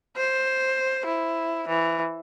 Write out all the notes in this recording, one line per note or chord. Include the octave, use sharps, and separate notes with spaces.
C5
E4
E3